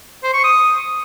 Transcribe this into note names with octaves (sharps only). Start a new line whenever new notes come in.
C5
C#6
D#6